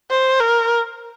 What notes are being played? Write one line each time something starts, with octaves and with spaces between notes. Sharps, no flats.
C5
A#4